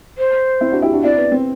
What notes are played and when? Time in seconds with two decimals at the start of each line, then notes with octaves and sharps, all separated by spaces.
0.18 C5
0.61 C4 E4
0.72 D4 F#4
0.82 E4 G4
0.93 D4 F#4
1.03 C4 E4 D5
1.18 B3
1.32 C4